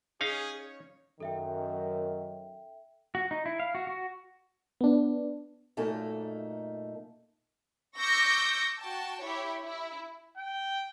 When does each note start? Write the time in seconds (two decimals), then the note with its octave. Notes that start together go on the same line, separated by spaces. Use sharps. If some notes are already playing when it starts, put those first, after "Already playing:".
0.21 C#4 D#4 G#4 F5
0.56 C#5
1.20 F#2 D#3 A4 E5 G5
3.15 F#4
3.31 D#4
3.46 E4
3.60 F5
3.75 F#4
3.87 F#4
4.81 B3 D4
5.77 F#2 A#2 A3 A#3 D#4 A4
7.97 C#6 D6 E6 G6 A#6 C#7
8.80 F#4 G5 A5
9.22 E4 G4 C#5
9.64 E4
10.37 G5